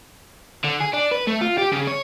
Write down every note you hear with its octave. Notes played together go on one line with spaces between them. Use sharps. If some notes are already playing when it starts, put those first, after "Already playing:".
D3
G#4
D4
B4
A3
F4
G4
C#3
C#5